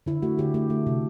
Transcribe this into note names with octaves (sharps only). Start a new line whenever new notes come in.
D3 E4
A3 F#4
D3 G4
A3 G4
A3
C3